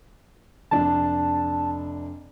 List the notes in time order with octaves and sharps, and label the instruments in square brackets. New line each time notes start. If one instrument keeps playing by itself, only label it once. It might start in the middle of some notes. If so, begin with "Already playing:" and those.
[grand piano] F1 D4 [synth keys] A5